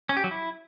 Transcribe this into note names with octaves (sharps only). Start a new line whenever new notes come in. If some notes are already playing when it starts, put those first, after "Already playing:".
C#4
G4
F#3
E4